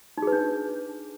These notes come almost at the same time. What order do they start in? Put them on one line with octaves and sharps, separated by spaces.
D#4 G#4 B4 D4